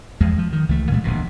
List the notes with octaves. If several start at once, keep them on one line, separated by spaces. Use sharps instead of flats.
E2 F3 G#3
F3
D#3
C#2 E3 A3
A#2 E3 G#3 A3
D1 A#1 E2 B2